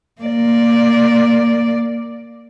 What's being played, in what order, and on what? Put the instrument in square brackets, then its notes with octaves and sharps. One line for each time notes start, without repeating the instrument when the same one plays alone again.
[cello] A#3 D5